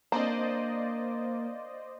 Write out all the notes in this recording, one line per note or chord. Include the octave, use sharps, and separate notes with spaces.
A#3 C4 D4 C5 D5 D#5 A#5